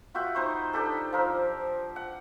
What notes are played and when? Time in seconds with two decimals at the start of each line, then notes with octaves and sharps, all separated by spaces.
0.14 F4 F#4 E5 G5
0.35 D#4 B4 C5 C#6
0.73 D4 D#4 G4 A4
1.12 F3 A#4 E6
1.96 F#5